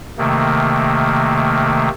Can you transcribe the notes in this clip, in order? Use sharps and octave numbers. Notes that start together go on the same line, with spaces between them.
C3 D#3 A3 A#3